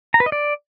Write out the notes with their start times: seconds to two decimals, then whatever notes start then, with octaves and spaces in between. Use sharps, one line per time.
0.14 A#5
0.20 B4
0.26 D#5
0.32 D5